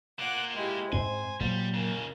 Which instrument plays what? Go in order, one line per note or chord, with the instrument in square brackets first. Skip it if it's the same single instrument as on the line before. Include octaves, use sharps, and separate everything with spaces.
[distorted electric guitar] A#3 F4 [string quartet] F#5 D6 F#6
[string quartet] G#3 E4 G4
[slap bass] G#2 C4 [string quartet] C5 [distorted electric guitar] G#5
[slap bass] A#2 F#3 [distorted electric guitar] G3
[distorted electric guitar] F2 C#3 [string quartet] A#4